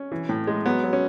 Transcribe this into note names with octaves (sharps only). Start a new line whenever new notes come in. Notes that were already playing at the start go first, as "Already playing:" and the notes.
Already playing: C#4
E3
A2
G#3
F#3 B3
F#3
C#4